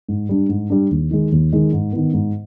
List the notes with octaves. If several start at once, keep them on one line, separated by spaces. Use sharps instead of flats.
G#2
G3 D4
G#2
G3 D4
D#2
D#3 G#3
D#2
D#3 G#3
G#2
D#3 B3
G#2